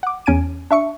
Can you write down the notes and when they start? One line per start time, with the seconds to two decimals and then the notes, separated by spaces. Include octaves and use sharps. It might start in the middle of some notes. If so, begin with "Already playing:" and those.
0.03 F#5 D6
0.26 E2 C#4 G#5 G#6 D7 D#7
0.71 D4 E5 C#6 C#7